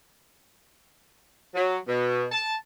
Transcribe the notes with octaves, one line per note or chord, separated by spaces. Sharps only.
F#3
B2
A5